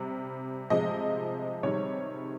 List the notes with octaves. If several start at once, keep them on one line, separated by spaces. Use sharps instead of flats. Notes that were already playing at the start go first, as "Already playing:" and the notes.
Already playing: C3 G3
C3 F3 G#3 D#5
C3 D#3 G3 C#5